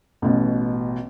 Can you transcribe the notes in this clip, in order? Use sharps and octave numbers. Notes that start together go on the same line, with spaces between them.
A1 B2